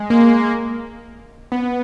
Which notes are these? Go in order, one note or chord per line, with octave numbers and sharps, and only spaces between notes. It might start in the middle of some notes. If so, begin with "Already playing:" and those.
Already playing: G#3
A#3
B3